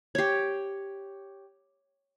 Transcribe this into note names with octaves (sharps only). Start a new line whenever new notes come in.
G4 C#5